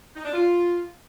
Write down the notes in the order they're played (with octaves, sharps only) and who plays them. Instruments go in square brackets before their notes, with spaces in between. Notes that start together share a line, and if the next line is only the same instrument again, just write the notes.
[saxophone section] D#4
D4
F4